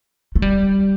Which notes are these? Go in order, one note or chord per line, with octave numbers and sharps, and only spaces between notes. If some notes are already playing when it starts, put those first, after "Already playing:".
A3
G3